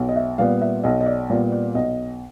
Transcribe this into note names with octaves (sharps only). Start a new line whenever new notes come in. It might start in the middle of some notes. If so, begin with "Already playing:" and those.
Already playing: B1
D#5
E5
A#2 G3 B3 F5
E5
B1 D#5
D#5
D5
A#2 G3 B3
D5
B1 D#5